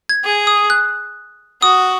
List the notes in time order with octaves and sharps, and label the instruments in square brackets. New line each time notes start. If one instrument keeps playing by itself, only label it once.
[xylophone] G#6
[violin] G#4
[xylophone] D#6
F#6
[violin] F#4 [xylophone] D#6